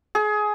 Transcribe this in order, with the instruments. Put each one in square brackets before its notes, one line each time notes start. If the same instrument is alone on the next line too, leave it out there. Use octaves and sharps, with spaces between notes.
[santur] G#4